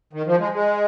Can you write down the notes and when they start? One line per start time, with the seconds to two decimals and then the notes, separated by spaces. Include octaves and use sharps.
0.13 D#3
0.27 F3
0.39 G#3
0.53 G#3